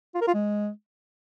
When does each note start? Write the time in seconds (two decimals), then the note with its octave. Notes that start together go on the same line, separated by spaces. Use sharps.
0.15 F4
0.21 A#4
0.27 F4
0.34 G#3